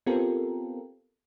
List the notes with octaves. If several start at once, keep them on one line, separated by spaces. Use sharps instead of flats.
B3 C4 F4 G4 A4 A#4